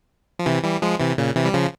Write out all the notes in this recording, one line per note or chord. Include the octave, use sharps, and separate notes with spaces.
F3
C3 E3
E3 G3
F3 G#3
C3 E3
A#2 C#3
C3 E3
G3
C#3 F3